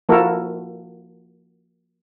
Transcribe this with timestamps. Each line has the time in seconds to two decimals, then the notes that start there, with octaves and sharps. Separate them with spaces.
0.09 F3 A#3 E4 F#4 A4 A#4